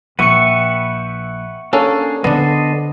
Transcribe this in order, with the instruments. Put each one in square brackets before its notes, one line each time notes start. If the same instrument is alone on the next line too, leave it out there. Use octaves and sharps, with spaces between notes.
[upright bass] A#1 [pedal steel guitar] B4 E5 G5 [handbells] F#5 C#6 C#7
[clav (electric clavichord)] A#3 C#4 A4 [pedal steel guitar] D4 G#4
[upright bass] D3 [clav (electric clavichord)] B3 D4 [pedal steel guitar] A4 C5 D#5